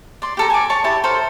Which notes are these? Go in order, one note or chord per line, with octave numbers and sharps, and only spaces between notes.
D5 C6
G4 A4 A#5
G#5 D6
C#5 A5 C#6
E4 G4 A5
A4 A#4 C5